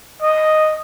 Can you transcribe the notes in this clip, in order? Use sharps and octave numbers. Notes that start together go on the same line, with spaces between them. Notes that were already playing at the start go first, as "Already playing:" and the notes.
D#5